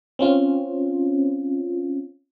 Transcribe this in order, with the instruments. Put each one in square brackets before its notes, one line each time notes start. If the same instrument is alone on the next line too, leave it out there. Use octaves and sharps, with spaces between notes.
[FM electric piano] C4 C#4 F4